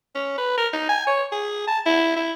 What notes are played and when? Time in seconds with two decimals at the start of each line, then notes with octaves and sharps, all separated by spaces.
0.15 C#4
0.38 B4
0.58 A#4
0.74 D#4
0.89 G#5
1.07 C#5
1.32 G#4
1.68 A5
1.86 E4
2.17 E4